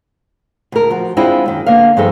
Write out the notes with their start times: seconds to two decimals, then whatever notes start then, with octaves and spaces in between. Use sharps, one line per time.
0.72 D2 A#4
0.90 F3 F#4
1.17 G#3 C4 D4 E4 F4 G#4
1.46 F#2 D#3
1.66 D3 A#3 B3 F5
1.97 G2 F3 G#3 D#4 A4 E5